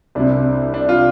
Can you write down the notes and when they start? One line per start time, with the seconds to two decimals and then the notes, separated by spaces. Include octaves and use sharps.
0.15 C2 C3 D4
0.74 D4
0.89 F4